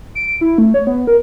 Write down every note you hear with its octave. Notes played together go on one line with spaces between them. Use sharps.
D7
E4
A3
C#5
B3
A#4